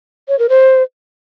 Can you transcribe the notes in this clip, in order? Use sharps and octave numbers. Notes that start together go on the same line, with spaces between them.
C#5
A#4
C5